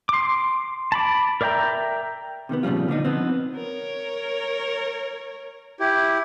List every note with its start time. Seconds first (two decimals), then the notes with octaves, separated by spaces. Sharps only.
0.09 C6 D6
0.92 A5 B5 D6
1.41 A#4 D5 E5 G5 A#5
2.49 C3 D#3 G#3 B3
2.63 A#2 C#3 F3 G3 F4
2.88 D3 F3 D4 D#4
3.05 F3 B3 C4
3.56 A#4 C#5
5.80 E4 G4